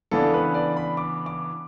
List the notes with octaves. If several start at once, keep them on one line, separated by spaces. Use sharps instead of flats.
C#3 E3 B3 D4 A4
B4
D5
B5
D6
D6